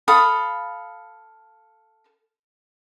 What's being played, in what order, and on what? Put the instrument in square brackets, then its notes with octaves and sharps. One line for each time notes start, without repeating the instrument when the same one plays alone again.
[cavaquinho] A4 F5 B5 D#6